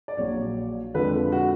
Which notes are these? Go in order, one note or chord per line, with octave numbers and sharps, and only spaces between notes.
D5
A#1 A#2 F#3 C#5
F2 D3 F3 G#3 B4
F#4